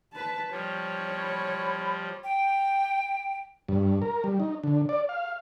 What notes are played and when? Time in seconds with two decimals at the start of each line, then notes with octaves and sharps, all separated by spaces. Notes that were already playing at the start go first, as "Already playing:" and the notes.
0.13 B4 A5
0.51 F3 G3 C#5
1.21 B5
2.24 G5
3.68 G2
4.02 A#4
4.24 G3
4.40 D#4
4.63 D3
4.89 D5
5.09 F5